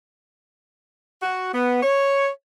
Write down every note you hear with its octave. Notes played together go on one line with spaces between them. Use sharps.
F#4
B3
C#5